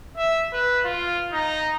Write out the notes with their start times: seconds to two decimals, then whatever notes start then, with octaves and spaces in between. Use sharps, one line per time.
0.18 E5
0.53 B4
0.85 F4
1.33 D#4